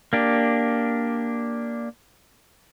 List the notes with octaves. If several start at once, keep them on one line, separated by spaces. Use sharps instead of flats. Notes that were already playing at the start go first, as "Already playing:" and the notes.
A#3 D4 G4